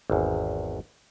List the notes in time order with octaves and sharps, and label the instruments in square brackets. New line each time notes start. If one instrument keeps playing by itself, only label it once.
[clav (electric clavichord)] G#1 E2